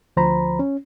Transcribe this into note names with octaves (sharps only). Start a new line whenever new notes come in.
D2 F3 C5 A#5 B5
C#4